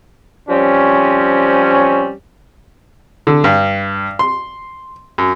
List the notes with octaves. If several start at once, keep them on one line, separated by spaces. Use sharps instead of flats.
F3 G3 C4 C#4
D3
G2
C6
F#2